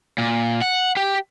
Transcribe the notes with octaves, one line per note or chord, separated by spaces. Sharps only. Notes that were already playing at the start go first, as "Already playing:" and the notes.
A#2
F#5
G4